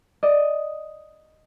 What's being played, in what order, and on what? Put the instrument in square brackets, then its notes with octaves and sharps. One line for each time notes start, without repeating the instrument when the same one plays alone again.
[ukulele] D5 D#5